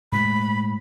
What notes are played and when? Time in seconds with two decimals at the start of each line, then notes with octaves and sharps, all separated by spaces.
0.12 A2 G#3 B5